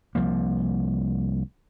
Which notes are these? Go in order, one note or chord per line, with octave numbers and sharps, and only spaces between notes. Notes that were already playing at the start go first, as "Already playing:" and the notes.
C2 F3 A#3